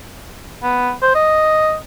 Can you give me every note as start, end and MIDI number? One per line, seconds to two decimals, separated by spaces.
0.63 0.91 59
1.02 1.13 72
1.15 1.76 75